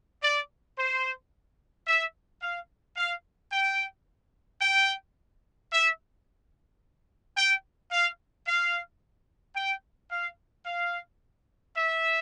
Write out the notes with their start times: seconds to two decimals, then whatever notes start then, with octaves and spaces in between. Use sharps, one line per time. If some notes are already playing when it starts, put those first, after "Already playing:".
0.22 D5
0.78 C5
1.87 E5
2.42 F5
2.97 F5
3.52 G5
4.61 G5
5.72 E5
7.37 G5
7.91 F5
8.47 F5
9.56 G5
10.11 F5
10.66 F5
11.76 E5